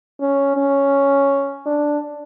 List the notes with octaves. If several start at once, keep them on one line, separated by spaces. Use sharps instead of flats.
C#4
C#4
D4